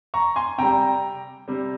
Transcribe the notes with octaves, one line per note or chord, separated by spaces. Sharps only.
A#5 C#6
G#5 C6
C3 G3 G5 A#5
C3 G3